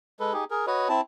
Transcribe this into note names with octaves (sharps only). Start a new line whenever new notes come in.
G#3 A4 B4
D#4 G4 G#4
G#4 A#4
F#4 B4 C#5 D#5
C4 E4 A5